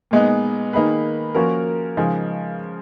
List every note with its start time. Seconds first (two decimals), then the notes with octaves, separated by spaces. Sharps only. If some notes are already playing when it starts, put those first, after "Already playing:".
0.11 A#2 G#3 B3 D#4
0.73 D#3 A#3 D#4 G#4 B4
1.35 F3 A#3 C#4 F#4 A#4
1.97 C#3 F3 G#3 D#4 G#4